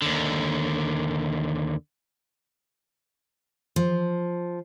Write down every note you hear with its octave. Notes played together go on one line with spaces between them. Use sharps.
D#2 D3
F3